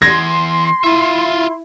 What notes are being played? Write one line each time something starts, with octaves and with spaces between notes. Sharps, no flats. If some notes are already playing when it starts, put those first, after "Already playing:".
E2 C6 G#6 A#6
E4 F4 E5